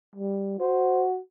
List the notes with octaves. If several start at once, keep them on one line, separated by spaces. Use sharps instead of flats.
G3
F#4 C5